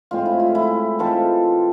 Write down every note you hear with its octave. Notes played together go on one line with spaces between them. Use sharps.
A2 G#3 C4 F4
E4
F4
E4 G#4
E3 G#3 C4 F4 A4